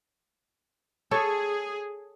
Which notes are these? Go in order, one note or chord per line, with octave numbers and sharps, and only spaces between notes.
G#4 A4 C#5